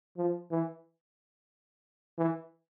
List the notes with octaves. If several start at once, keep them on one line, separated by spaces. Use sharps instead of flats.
F3
E3
E3